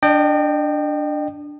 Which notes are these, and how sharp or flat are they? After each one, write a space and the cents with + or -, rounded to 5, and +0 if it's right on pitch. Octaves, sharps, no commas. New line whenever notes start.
D4 +0 D#5 -40 G5 +0